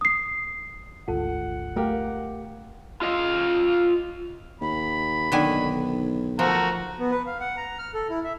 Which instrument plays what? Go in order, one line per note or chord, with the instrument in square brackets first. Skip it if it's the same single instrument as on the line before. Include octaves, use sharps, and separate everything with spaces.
[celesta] D#6 C7
[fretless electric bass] G#1 D2 [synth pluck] F4 A4 [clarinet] F#5
[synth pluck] A3 F5 [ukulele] G4 A#4
[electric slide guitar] F4 D#5 F5
[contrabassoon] D#2 [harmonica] B5
[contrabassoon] B1 [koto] D3 D#3 G#5
[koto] F3 [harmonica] A3 F#4 A#4
[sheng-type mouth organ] B3
B4
F5
F#5
A#5
F6
A4
E4
E5